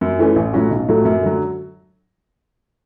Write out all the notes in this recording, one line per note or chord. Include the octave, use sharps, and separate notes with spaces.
F#2
E3 A3 C#4
A1
A2 F#3 C#4 F#4
B1
A2 F#3 A3
F#2
D3 F#3